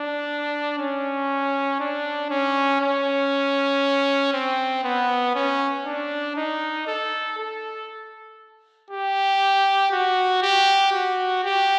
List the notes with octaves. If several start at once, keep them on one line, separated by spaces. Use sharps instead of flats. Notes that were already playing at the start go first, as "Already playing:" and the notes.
Already playing: D4
C#4
D4
C#4
C#4
C4
B3
C#4
D4
D#4
A4
A4
G4
F#4
G4
F#4
G4